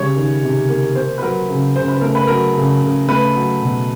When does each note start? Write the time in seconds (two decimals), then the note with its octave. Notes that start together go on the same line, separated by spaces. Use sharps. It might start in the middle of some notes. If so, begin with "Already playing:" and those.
Already playing: C#3 G3 C#5
0.16 D#3
0.43 C3
0.69 A#3
0.95 A#3 C5
1.18 B4
1.22 F#3 A#4
1.49 C#3
1.75 C#3 C5
1.88 B4
2.01 A3 A#4
2.15 B4
2.27 F#3 A#4
2.55 C#3
2.81 C#3
3.08 A3 B4
3.35 F#3
3.62 B2